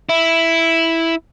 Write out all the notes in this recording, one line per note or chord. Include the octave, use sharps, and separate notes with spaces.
E4